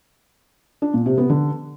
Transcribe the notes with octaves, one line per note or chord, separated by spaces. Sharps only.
D4
A#2
C3
B3
D3